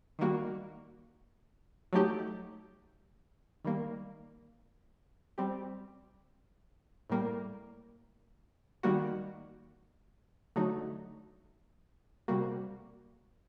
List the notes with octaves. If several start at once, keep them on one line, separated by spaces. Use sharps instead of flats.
D#3 G3 A#3 F#4
F#3 A3 D#4 G4
D#3 G3 A#3
G3 C4 G4
A2 G3 A#3
D#3 G3 A#3 F#4
D3 F#3 A3 D#4 F#4
C3 G3 A#3 F#4